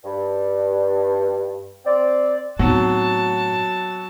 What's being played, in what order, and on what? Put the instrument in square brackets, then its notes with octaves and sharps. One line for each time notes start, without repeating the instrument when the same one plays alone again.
[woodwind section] G2
C4 D5
[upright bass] A2 [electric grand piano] F#3 [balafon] B3 C4 D#4 [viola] F#4 A5